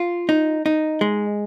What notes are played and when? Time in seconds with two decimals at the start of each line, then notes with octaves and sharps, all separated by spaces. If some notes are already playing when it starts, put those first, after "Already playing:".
Already playing: F4
0.29 D#4
0.66 D#4
1.01 G#3